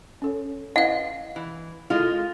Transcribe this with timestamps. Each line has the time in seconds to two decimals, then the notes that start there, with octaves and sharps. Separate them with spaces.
0.22 C#4 A4 C#5
0.76 E4 B4 D#5 F5 F#5
1.36 E3
1.90 G#3 E4 F4 A4